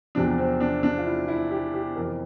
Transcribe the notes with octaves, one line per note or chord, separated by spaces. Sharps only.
E2 C3 F3 D4
C4
D4
D4
F4
E4
E4
G4
G4
F2 C3 E3 A#4